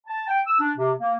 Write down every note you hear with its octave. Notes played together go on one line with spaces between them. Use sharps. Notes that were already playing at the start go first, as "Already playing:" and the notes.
A5
G5
E6
D4
C3
A#3